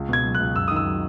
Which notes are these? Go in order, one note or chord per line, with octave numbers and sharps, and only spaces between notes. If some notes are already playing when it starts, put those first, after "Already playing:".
Already playing: C#2
B2 G#6
F#3
F#6
C#2
F#2 E6
D#3 D#6
E6
F#3